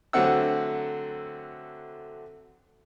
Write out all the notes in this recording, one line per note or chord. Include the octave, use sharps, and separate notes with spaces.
D3 F#3 A3 C4 F#5 E6